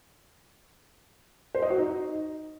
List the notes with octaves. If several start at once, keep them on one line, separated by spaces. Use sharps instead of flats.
C5
D#5
F#4
D#4